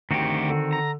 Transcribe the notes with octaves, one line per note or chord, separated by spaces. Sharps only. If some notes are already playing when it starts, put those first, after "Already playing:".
D2 D#3 C4 F#4 G4
D3
A#5